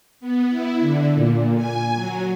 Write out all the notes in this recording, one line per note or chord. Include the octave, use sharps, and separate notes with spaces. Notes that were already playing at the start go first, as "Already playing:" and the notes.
B3
E4
D3
A#2
G#5
F#3